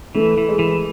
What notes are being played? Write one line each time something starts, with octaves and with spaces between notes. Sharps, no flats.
E3 A3
E3
G#3
E3